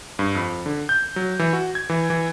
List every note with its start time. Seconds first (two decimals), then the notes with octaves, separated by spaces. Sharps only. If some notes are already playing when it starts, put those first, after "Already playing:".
0.19 G2
0.35 F2
0.66 D3
0.89 G6
1.16 F#3
1.39 E3
1.53 F#4
1.75 G#6
1.90 E3
2.10 E3